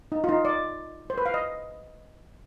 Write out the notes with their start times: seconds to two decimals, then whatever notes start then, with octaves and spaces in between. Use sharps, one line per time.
0.12 D#4
0.24 F4
0.29 D#4
0.45 D5
1.10 C5
1.18 B4
1.26 F5
1.34 D#5